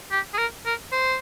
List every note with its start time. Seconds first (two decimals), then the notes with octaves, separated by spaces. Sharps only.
0.12 G4
0.34 G#4
0.38 A#4
0.66 A#4
0.92 C5